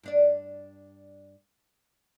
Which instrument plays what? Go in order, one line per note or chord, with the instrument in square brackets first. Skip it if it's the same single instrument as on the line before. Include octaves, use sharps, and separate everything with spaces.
[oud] G2 D4 D5